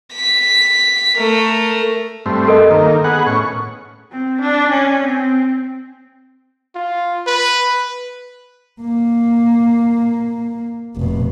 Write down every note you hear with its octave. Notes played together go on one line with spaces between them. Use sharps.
B6
A3 A#4
G2 A3 C4
A4 A#4 D#5
D#3 A#3
B3 G#4 F#5
A2 C#4 C#6
C4
D4
C#4
C4
F4
B4
A#3
F1 B2